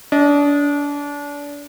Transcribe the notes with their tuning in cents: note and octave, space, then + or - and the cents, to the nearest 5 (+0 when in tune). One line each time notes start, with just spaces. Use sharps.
D4 -30 D#5 +0